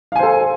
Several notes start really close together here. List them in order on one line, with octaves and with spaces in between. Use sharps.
F5 G#5 C5 A4